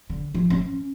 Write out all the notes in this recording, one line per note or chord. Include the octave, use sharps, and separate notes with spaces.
D3
F3
C#4